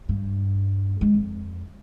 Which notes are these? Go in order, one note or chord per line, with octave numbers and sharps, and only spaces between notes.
G2
G#3
F2